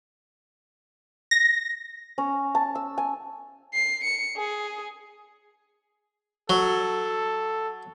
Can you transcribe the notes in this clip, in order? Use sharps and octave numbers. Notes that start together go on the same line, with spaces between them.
A#6
C#4
A5
E6
G#5
C7
C#7
G#4
F#3 A4